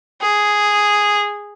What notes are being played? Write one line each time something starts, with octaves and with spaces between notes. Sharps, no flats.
G#4